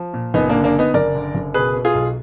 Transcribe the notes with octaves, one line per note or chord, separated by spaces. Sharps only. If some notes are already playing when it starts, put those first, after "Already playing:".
Already playing: F3
A#2
F#1 B3 D#4
D3 A#3 D4
A#3 D4
D3 B3 D#4
F#1 A#4 D5
D3
F#1
B2 G#4 B4
B2
F4 G#4
B1